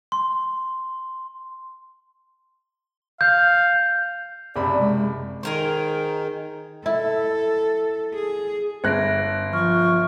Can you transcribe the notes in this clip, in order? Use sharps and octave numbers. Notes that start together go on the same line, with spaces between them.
C6
F5 G6
F#1 C3 D5 B5
G#3
D#3 G#4 A#4 C5
E4 A4
G#4
G1 F#6 G#6 A#6 D7
F3 C#6 F6